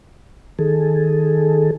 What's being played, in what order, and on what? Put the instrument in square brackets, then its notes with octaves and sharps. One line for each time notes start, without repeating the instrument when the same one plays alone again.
[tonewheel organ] D#3 G#4 A4